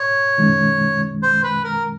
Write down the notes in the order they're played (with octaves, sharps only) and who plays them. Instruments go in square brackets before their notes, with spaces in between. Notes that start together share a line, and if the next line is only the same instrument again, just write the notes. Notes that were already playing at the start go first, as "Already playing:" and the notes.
Already playing: [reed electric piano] G#2 [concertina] C#5
[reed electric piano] F#2 D#3 G#3 C#4
[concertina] C5
B4
A#4